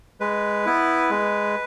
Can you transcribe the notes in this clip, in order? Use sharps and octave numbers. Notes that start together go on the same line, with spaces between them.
G#3 B4
B3 E4
G#3